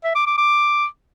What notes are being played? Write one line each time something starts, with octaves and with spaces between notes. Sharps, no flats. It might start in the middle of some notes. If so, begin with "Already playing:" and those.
E5
D6
D6
D6